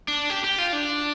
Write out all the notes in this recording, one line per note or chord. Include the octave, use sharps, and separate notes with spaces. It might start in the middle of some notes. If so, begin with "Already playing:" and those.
D4
G4
G4
F4
D4